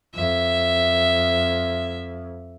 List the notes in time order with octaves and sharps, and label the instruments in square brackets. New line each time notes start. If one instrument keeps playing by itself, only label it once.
[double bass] F2 [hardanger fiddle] E5